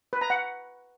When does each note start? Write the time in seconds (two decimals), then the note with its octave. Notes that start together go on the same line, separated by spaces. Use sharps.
0.13 B4
0.21 A#5
0.30 F#5